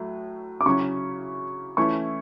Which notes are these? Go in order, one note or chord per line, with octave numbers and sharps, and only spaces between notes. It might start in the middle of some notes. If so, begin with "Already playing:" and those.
Already playing: A2 F#3 A3
D6
C#3 F#3 C#4 E4 C#6
E3 A3 C#4 E4 C#6